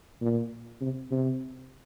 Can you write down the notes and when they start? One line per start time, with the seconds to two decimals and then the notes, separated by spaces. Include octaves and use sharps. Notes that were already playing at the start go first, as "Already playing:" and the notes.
0.21 A#2
0.81 C3
1.11 C3